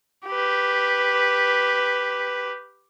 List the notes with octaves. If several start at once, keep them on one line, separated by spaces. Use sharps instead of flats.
G4 B4